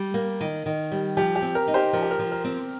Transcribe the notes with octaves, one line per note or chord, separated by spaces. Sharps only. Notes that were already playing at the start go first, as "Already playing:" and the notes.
Already playing: G3
A#3
D#3
D#3
G3
F3 G4
G4
C4
A#4
D#4
G4 C5
F3 A#4
G4
A#4
F3
A#4
C4